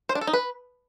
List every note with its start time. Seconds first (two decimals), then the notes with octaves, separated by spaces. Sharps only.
0.09 C5
0.15 D4
0.21 A4
0.27 D#4
0.33 B4